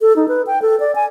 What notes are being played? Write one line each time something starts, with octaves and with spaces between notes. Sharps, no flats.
A4
D#4
B4
G5
A4
D5
G#5